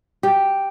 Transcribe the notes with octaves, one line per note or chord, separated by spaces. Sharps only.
G4